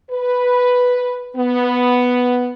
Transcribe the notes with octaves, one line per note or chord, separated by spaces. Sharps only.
B4
B3